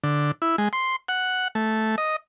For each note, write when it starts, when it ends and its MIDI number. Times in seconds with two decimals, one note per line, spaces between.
0.04 0.31 50
0.42 0.56 64
0.58 0.68 56
0.73 0.96 84
1.09 1.48 78
1.55 1.96 57
1.98 2.16 75